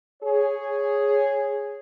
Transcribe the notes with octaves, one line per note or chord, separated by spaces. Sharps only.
G#4 C#5